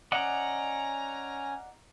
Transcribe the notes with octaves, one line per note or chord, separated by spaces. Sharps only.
C#4 D5 D#5 F#5 G#5 A#5